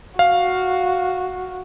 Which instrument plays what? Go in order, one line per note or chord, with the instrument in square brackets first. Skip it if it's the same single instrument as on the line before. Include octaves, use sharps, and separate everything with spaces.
[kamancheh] F#4 [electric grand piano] F5